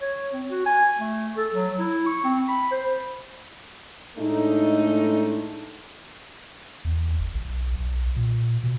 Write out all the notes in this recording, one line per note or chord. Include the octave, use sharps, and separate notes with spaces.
C#5
C4
F#4
G#5
A3
A4
F#3
E4
C#6
C4
B5
C5
A2 G#3 A3 D4 D#4
E2
G1
B1
B1
A#2
B2